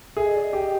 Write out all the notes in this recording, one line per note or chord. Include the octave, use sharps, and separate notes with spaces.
G#4 E5
D#5
D5
D#5
G4